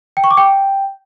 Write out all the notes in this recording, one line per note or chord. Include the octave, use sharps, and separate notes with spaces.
G5
C#6
D6
G5